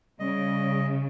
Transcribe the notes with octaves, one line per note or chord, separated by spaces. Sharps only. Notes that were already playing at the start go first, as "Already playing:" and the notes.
C#3 G3 D#5